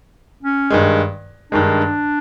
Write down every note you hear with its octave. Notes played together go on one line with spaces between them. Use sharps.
C#4
G2 D#3 G#3
G2 D#3 G#3 D4